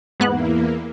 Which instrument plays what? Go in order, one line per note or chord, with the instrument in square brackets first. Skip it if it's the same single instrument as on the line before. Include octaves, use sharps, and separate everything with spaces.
[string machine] E2 E3 A#3 [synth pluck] G#2 B3 F#6